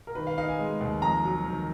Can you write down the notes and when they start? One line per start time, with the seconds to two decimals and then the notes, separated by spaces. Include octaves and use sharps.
0.07 A#4
0.15 D#3 B4
0.27 F5
0.38 D#4 F5
0.48 G#5
0.59 G#3
0.81 D#2
1.02 F2 A#5
1.24 F#3
1.46 D#3